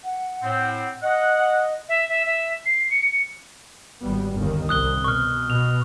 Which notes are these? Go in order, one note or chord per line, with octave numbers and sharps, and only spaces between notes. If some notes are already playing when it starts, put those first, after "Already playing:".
F#5
A2 C4
D#5 F#5
E5
E5
E5
C7
C#7
G#1 G3 B3
G1 D#2 D#3
C2 D#6 F#6 G7
B2 C#6 F6
B2 F7